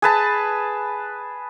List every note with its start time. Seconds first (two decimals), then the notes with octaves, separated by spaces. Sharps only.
0.02 G#4 B4 A5